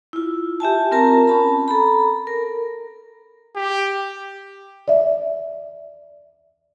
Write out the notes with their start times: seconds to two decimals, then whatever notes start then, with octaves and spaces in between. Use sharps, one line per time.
0.13 E4 F4
0.60 G4 E5 G#5 A5
0.91 C4 F4 A#4 A5 A#5
1.27 C#4 A5 B5
1.68 A4 A#5 B5
2.27 A#4
3.56 G4
4.88 D5 E5